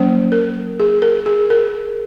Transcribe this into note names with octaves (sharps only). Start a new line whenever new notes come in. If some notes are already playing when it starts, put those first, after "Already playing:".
Already playing: F#3 A#3 C#4 C5
A#4
G#4
A#4
G#4
A#4